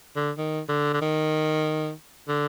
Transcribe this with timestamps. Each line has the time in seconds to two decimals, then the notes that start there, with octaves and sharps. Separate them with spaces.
0.16 D3
0.38 D#3
0.69 D3
0.94 D3
1.02 D#3
2.29 D3